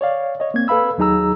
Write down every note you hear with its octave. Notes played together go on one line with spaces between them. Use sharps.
C#5 D5 F5
C#5 D#5
A#3 C4 G#6
A4 B4 F5 B5 E6
D#2 F#3 D#4 G#4 A#5 E6